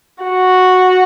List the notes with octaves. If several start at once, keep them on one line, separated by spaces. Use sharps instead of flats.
F#4